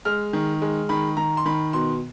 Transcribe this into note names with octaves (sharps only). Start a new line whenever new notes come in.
G#3 F6
D#3
G#3
D#3 B5
D#3 A#5
C6
D#3 B5
B2 C6